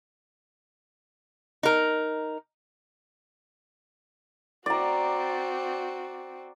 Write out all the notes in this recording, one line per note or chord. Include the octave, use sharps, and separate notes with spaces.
D#4 A#4
C4 F#4 D5 A#5